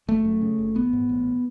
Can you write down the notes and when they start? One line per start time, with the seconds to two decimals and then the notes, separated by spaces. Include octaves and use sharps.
0.08 F#1 A3
0.25 F#2
0.42 C#3
0.59 F#1
0.75 A1 B3
0.93 G#2
1.09 A1